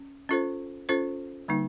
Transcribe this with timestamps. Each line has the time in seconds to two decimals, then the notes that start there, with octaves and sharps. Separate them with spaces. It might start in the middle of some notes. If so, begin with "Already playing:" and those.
Already playing: C#4
0.29 C#4 F4 A4 C5
0.89 C#4 F4 A4 C5
1.48 D3 G3 A#3 D#4